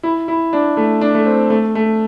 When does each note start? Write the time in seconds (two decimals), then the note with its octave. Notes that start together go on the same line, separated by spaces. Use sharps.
0.03 E4
0.28 E4
0.53 D4
0.77 A3
1.01 D4
1.15 A3
1.26 C4
1.50 A3
1.75 A3